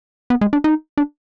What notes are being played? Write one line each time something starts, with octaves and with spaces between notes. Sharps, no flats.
B3
G#3
D4
D#4
D4